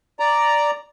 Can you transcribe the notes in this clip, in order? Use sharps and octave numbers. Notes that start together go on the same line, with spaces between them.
D5 A#5